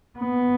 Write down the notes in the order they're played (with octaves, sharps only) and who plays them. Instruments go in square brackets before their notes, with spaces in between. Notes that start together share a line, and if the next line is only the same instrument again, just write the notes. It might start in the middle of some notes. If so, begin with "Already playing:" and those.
[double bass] B3